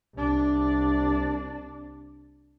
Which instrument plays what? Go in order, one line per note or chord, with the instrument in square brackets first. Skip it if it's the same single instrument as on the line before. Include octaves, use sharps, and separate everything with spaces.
[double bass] C2 D4